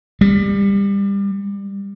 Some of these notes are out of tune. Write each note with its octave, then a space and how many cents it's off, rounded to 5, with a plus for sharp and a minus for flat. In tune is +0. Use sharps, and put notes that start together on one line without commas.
G3 +25